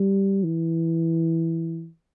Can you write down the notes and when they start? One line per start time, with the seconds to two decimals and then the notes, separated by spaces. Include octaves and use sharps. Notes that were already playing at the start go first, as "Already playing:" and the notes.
Already playing: G3
0.44 E3